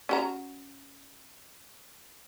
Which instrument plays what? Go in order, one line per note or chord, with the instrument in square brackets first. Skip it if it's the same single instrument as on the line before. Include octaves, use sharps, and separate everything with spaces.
[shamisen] C#4 F#4 A#5